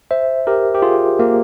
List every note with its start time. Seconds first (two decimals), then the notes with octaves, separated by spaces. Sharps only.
0.11 C5 E5
0.47 G4 A#4
0.75 G4
0.82 F4 G#4
1.19 A#3